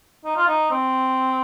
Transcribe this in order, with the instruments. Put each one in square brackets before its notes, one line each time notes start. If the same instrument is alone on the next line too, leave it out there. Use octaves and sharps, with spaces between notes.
[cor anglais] D#4
F4
D#4
C4